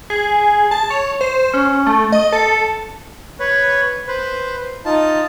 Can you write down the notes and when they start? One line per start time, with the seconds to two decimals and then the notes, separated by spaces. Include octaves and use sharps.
0.10 G#4
0.71 A5
0.90 C#5
1.21 C5
1.54 C#4
1.87 A3
2.12 D#5
2.32 A4
3.40 B4 C#5
4.08 B4 C5
4.85 D#4 F4 A5